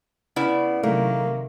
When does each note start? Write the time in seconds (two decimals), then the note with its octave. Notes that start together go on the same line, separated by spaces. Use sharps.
0.36 C#3 B3 E4 D5
0.83 C3 D#3 F#3 A3 A#3